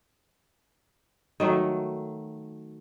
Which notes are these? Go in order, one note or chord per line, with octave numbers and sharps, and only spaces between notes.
D#3 F#3 A3